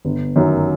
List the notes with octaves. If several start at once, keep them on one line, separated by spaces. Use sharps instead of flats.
G1
F#2 D#3 F#3